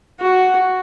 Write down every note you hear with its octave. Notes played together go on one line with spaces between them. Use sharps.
F#4